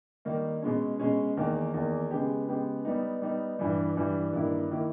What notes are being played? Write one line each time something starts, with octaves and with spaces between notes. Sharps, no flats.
D#3 G3 A#3 D#4
B2 G#3 C#4
B2 G#3 C#4
E2 D#3 A#3
E2 D#3 A#3
C#3 G#3 B3 G4
C#3 G#3 B3 G4
G3 B3 D#4
G3 B3 D#4
G2 E3 G3
G2 E3 G3
G2 D#3 A#3 E4
D#3 A#3 E4